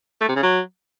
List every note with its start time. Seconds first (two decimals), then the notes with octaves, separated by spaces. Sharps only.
0.21 A3
0.28 C3
0.36 C#3
0.43 F#3